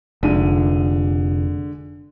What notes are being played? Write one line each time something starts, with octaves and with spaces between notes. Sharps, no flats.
F1 D3 G#3 D#7